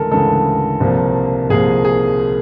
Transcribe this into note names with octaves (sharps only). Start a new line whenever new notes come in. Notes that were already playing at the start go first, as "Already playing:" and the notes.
Already playing: D2 C#3 E3 G#3 A4 A#4
D2 C#3 E3 G#3 A4
C2 A#2 F3 A#3
C2 A#2 F3 A#3 G#4
G#4